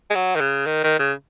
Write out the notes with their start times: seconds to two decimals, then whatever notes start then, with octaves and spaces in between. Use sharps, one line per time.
0.10 G#3
0.15 F#3
0.36 D#3
0.40 C#3
0.66 D#3
0.84 D#3
0.99 C#3